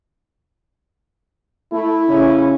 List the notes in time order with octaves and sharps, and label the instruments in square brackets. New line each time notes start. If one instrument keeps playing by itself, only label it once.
[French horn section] A3 [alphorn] E4
[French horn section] C#3 C#4